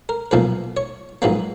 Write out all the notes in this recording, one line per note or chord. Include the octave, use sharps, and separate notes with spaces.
A#4
B1 A#2 F3 A#3 B4
C#5
A#1 G#2 F#3 A#3 B4